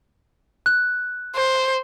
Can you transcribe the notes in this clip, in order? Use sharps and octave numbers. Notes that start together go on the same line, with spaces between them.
F#6
C5